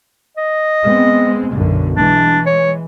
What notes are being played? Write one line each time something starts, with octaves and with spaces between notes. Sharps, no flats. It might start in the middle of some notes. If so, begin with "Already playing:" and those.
D#5
G#3 B3 C4
B1 F#2 D3
E3 G#3 D4
C#5